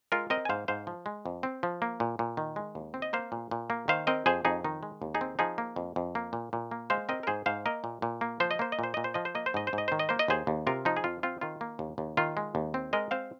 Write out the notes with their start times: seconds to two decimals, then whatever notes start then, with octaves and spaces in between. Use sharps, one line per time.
0.12 G#3 F4 A#4
0.30 C4 A#4 D#5
0.45 G#5
0.49 G#2 C5 F5
0.68 G#2 C5 F5
0.87 F3
1.06 G#3
1.26 F2
1.43 C4
1.63 F3
1.82 A#3
2.00 A#2
2.19 A#2
2.37 D#3
2.56 G#3
2.75 D#2
2.94 C4
3.02 D#5
3.13 A#3 C5 F5
3.32 A#2
3.51 A#2
3.70 A#3
3.88 D#3 C5 F5
4.07 C4 A#4 D#5
4.26 F2 G#4 C5
4.45 F2 D#4 G#4
4.64 D#3 D#4
4.83 G#3
5.02 D#2
5.15 D#4 G#4
5.21 C4
5.39 F3 D#4 G#4
5.58 A#3
5.76 F2
5.96 F2
6.15 A#3
6.33 A#2
6.53 A#2
6.71 A#3
6.90 G#3 C5 F5
7.09 C4 A#4 D#5
7.23 A#4
7.27 G#2 G#4 C5
7.46 G#2 C5 F5
7.66 A#3 A#4 D#5
7.84 A#2
8.02 A#2
8.21 A#3
8.40 F3 C5
8.51 D#5
8.59 A#3 C5
8.72 D#5
8.79 A#2 C5
8.94 A#2 D#5
9.04 C5
9.14 F3 D#5
9.25 C5
9.35 A#3 D#5
9.46 C5
9.54 G#2 D#5
9.67 C5
9.73 G#2
9.78 D#5
9.88 D#3 C5
9.99 D#5
10.09 A#3 C5
10.19 D#5
10.28 D#2 G#4 C5
10.47 D#2
10.67 C3 F4 A#4
10.85 F3 D#4
10.97 G#4
11.04 F2 F4
11.23 C4 F4
11.41 D#3 F4
11.61 A#3
11.79 D#2
11.98 D#2
12.17 D#3 F4
12.37 G#3
12.55 D#2
12.74 C4
12.93 G#3 A#4 D#5
13.11 C4 C5 F5